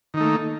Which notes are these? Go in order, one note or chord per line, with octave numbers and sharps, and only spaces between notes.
D#3 A3 A#3 D#4